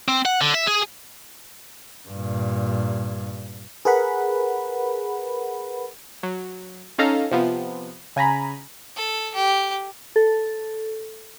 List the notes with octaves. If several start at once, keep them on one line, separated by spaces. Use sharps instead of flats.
C4
F#5
D3
E5
G#4
G2 A#2
G#4 A#4 B4 F#5 B5
F#3
C#4 D#4 A4 F5 A#5
C3 F3 B3
C#3 G#5 A#5 B5
A4
G4
A4